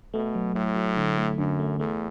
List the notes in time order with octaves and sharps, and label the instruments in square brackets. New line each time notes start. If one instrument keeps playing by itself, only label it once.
[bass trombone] B2 [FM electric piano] A3
[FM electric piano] F#3
[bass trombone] A2 [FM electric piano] A3
[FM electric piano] F#3
D3
A3
[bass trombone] F#2 [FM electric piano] D3
[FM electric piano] A3
[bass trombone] E2 [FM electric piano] A3